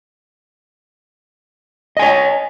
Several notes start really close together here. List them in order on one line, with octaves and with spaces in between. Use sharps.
D#5 G#5 C#5